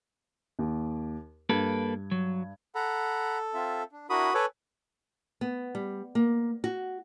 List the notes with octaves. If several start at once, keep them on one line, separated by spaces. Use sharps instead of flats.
D#2
G2 A#3 A4 B4 G#6
F#3
A4 F#5 A#5 B5
C4 F4 E5
D4
D4 E4 F#4 A#4 B5 D#6
A4 B4 C#5 G#5 D6
B3
G3
A#3
F#4